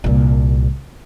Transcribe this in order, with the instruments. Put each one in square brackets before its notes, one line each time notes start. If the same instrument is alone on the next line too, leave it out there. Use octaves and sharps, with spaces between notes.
[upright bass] C2 A#2